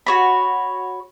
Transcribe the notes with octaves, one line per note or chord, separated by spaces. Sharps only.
F#4 C#5 B5